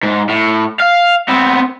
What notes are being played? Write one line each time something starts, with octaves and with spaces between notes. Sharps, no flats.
G#2
A2
F5
B3 C4